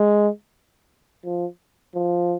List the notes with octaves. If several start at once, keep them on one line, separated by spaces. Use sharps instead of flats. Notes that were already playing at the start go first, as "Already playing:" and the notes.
Already playing: G#3
F3
F3